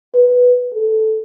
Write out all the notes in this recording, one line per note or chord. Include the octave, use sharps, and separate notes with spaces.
B4
A4